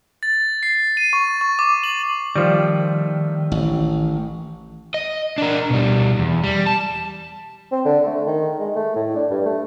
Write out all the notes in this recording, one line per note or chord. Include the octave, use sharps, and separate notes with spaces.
A6
C7
D#7
C#6
C#6
D6
F#7
D#3 F3 G3 A3
A1
D#5
D4 A#4
B2 G3
E2
G3
A5
C4
D3
A3
D#3
G#3
A3
A2
D4
G2
A3